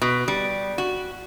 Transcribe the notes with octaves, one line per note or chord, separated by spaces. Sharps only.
B2
G3
F#4